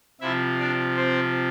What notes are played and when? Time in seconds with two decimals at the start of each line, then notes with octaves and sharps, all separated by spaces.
0.21 C3 F3 E4 E5
0.59 D4 D5
0.97 C4 C5